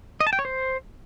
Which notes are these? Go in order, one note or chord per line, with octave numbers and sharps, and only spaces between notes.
D#5
A5
G5
C#5
C5